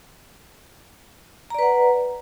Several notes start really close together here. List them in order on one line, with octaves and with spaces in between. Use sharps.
A#5 D5 B4 F#5